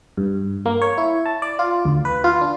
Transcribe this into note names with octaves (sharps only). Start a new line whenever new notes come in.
G2
A#3
C#5
E4
A5
D5
F4
D2
B4
F4
D4